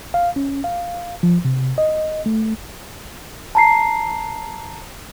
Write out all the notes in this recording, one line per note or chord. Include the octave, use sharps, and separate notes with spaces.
F5
C#4
F5
F3
C3
D#5
A3
A5 A#5 C7